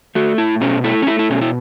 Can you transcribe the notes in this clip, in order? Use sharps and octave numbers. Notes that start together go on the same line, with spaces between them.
A3 F#4
A2 E4
B2 C#4
A3 E4
C#4
A3 E4
E4
B2 C#4
E4